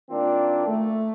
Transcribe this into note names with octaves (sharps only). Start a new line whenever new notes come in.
D#3 A#3 C4 D4 F4
A3